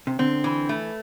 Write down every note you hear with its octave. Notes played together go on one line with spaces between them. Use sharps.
C3
D3 C4
E3
A3